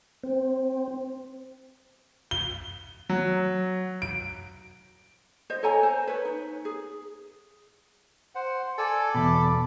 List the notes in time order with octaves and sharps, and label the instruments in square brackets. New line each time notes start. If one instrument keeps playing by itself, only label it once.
[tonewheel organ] C4
[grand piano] G7
F#3
D7
[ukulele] C5 D#5
A4 C#5 G#5 A#5
C5
B4 C#5
D#4
G#4
[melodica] C5 F#5
[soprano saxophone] A4 [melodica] D5 G#5 E6
[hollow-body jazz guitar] E2 B2 [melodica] B5 D6